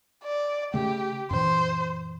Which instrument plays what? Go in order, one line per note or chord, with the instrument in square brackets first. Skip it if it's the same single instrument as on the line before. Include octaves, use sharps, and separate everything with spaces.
[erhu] D5
[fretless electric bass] C#3 A3 [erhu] G4
[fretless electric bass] F#2 A#2 E3 [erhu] C5